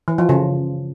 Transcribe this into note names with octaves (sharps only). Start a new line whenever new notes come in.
E3
F3
C#3